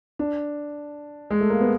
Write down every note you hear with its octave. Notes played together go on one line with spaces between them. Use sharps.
D4
G#3
A3
A#3
B3